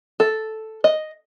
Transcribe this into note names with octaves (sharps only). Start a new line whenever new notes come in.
A4
D#5